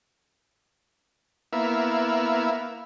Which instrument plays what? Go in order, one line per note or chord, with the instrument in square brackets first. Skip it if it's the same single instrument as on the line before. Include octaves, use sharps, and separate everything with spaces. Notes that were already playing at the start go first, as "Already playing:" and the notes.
[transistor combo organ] A#3 B3 E4 E5 F5